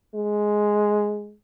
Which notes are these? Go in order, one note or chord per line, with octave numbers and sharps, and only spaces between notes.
G#3